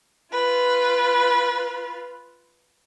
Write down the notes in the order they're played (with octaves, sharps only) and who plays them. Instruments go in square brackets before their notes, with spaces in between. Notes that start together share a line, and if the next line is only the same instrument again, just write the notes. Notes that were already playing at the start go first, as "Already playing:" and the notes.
[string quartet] F4 B4